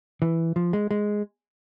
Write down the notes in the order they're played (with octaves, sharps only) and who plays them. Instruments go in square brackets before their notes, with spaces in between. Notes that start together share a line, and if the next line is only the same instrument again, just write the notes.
[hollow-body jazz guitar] E3
F3
G#3
G#3